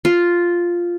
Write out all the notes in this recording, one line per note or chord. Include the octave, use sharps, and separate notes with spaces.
F4